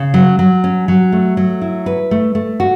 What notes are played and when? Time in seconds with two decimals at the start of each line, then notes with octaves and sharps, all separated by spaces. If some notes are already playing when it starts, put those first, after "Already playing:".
Already playing: C#3
0.14 F#3
0.39 F#3
0.64 C#4
0.88 F#3
1.12 A3
1.37 F#3
1.61 E4
1.86 B4
2.11 A3
2.35 A3
2.60 F#4